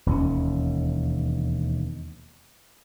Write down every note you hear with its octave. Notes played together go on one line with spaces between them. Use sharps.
E1 D#2 D#3 C#4